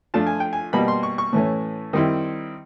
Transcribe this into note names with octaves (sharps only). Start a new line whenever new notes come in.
F3 A3 D4 F4 A5
G#5
G5
G#5
B2 G3 A#3 B5
C6
C#6
C#6
A2 E3 A3 C#4
D#3 G3 C4 E4